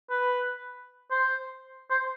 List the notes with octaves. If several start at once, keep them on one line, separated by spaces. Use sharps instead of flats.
B4
C5
C5